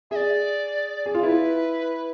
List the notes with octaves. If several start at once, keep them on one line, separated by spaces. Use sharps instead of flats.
G#4 D5 E5
G#4
F4
E4 B4